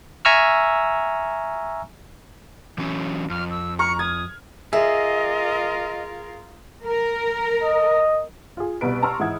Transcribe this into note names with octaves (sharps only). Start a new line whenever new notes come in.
E5 G#5 A#5 C#6 E6 F6
E3 F#3 C#4
F2 F6
E6
A#5 C#6 F6 C#7
D#6 G#6
F4 G#4 A#4 D#5 E5
A#4
D#5
F4 G#4
C2 B2 B4 D7
A5 A#5 C6 C#6 E6 F6
G#2 E3 E4 F#5 D#6 G#6